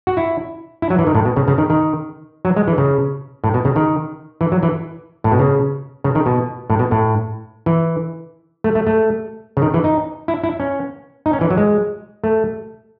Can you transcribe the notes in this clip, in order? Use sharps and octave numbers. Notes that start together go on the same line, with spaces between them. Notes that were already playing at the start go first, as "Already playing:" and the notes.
F#4
E4
E4
F#3
E3
D#3
A2
B2
C#3
C#3
D#3
D#3
F#3
G#3
E3
C#3
A2
B2
C#3
D#3
E3
F#3
E3
A2
B2
C#3
C#3
D#3
B2
A2
B2
A2
E3
A3
A3
A3
C#3
D#3
E3
D#4
E4
E4
C#4
D#4
C#4
E3
F#3
G#3
A3